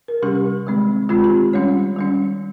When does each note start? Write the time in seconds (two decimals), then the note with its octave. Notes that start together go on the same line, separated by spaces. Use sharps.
0.08 A#4
0.22 C3 G3 C#4 G4
0.67 D#3 G#3 C4
1.09 D#3 G#3 C4 F4
1.24 G4
1.53 D#3 G3 C#4 C#5
1.96 D#3 G3 C#4